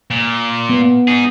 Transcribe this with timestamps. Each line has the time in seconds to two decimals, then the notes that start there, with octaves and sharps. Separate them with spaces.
0.11 A#2
0.70 B3
1.07 D#4 G#4